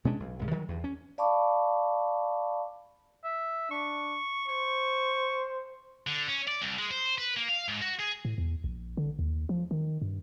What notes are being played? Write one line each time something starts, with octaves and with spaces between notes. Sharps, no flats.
B2 G#3 C#4 D4
B1
C2 G#2 C#3
D#3 E3 F#3 G3
E2 G2
C#4
D5 F5 A5 B5 C#6 D6
E5
D4 C#6
C5 C#6
D3
C#4
D5
C2
G#3
C5
B4
A#3
F5
G#2
F#4
G#4
A2
E2
A#1
D3
D#2
F3
D#3
G2